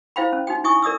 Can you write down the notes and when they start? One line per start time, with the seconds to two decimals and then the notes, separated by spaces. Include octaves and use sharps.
0.16 E4 C5 F5 G5 B5
0.33 C#4
0.47 D#4 F#4 G5
0.64 E4 E5 G#5 C#6 D#6
0.82 A#4 D5 E5 D#6 E6